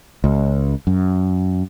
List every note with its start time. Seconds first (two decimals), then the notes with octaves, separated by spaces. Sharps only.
0.24 C#2
0.87 F#2